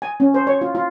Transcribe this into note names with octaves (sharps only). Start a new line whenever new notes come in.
G#5
C#4
C5
C#5
F4
F4